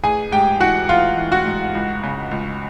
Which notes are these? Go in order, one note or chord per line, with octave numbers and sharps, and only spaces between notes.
A1 G#4 G#5
G#2 G4 G5
E3 F#4 F#5
E3 F4 F5
E3
F#4 F#5
G#2
C#2
C#3
C#2